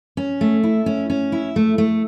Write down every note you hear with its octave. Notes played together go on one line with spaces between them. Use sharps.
C#4
A3
E4
C#4
C#4
E4
A3
A3